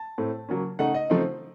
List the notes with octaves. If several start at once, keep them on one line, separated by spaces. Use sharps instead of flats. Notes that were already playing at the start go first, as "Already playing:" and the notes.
Already playing: A5
A2 A3 C4
C#3 F#3 A#3 C#4
C#3 A3 D#4 F#5
D#5
C#3 F3 A3 C4 D#4